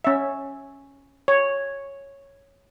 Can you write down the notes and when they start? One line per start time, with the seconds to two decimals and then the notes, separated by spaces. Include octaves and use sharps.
0.04 C#4 E5
1.28 C#5